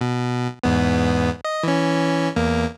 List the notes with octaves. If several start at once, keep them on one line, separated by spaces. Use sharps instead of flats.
B2
E2 G#2 B3
D#5
E3 C#4
E2 A#3